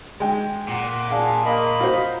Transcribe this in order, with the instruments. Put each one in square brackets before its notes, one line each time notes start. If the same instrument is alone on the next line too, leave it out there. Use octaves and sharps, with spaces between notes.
[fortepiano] G#3 G5
[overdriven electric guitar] A#2 [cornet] F#5
[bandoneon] D4 [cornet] G#4 [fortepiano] F5
[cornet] A#3 [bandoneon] D#5 B5
[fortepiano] F4 F#4 C5